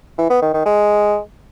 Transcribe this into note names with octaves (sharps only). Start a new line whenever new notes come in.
E3
B3
D#3
D#3
G#3